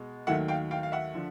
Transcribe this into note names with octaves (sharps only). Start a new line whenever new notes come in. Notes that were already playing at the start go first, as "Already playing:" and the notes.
Already playing: B2 G#3
D#2 D#3 F#3 A3 E5 F#5
F5 G5
F5 G5
F5
E5 F#5
D3 F3